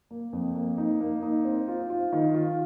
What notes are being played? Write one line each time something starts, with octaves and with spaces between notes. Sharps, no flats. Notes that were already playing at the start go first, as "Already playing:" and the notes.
A#3
F2
A#3
D#4
A#3
D#4
C4
F4
F4
D#3
F4